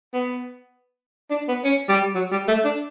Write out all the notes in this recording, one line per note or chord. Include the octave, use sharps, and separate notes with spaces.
B3
D4
B3
C#4
G3
F#3
G3
A3
D4